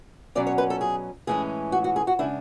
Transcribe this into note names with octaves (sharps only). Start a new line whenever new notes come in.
B2 F#3 C#4 D5
C#5
B4
A4
G#4
A2 E3 G#3 C#4 G#4
F#4
F#4
G#4
F#4
C#3 G#3 D4 E4